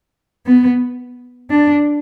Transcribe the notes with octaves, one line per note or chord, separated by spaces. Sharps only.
B3
D4